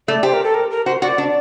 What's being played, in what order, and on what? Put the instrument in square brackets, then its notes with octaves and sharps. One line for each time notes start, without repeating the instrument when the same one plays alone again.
[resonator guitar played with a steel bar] A3 [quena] D5
[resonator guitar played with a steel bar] G4 [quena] C5
[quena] A#4
A4
A#4
A#4
[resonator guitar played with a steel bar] F#4 [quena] C5
[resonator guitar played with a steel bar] F#4 [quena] D5
[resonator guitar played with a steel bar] D4